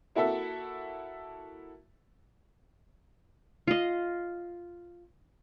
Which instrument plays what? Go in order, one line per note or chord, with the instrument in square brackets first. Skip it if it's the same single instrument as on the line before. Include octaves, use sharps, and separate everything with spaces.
[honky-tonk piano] A#3 E4 F#4 A4 E5
[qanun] F4 D#5